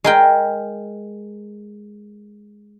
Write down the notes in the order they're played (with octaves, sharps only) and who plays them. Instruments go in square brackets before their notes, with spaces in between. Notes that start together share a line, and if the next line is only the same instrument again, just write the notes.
[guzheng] G#3 A#4 G5